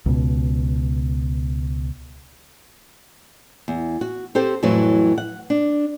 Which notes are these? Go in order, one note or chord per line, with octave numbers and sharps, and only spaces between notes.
C#2 B2
E2
F#4
C4 G4 A4 C5
F2 A2 E3 F#3
F#5
D4